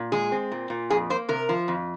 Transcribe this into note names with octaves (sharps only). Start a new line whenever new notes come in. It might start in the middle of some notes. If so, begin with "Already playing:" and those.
Already playing: A#2
G#3 G#4
C4
A#2
A#2
F2 G#4
A#3 C5
C3 A#4
F3
F2